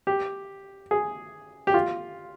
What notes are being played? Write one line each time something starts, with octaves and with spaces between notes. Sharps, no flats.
G4
G#4
G4
F4